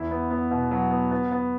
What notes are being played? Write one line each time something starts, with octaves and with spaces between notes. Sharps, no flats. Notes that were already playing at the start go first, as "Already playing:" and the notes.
Already playing: E2 E4
B3
B3
B2
F#3
B3
B3
B3